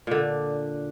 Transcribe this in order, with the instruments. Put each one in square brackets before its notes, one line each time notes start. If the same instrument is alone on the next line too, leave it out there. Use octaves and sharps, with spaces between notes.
[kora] A#2 D3